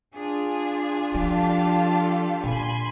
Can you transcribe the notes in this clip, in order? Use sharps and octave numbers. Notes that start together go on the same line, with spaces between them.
D4 F4 G#4
F3 G4 A4 F5
A#2 G#5 B5 C6